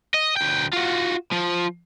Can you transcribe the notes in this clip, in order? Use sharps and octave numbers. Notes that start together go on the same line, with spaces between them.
D#5
D2 G5
F4 F#4
F3